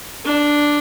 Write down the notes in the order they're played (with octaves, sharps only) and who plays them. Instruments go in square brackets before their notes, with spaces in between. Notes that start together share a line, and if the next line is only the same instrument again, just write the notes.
[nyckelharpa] D4